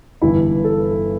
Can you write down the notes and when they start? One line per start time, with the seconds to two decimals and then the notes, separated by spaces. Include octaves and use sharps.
0.22 G1 G2 E3 E4
0.64 A4